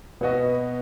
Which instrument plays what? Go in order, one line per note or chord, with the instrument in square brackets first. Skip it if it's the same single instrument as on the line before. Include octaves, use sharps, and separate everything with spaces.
[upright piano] B2 B3 F#4 D#5 [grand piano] B4